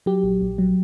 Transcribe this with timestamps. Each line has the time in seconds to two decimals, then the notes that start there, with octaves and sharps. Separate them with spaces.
0.06 F#3 G4
0.24 A#1
0.42 A#1
0.58 F#3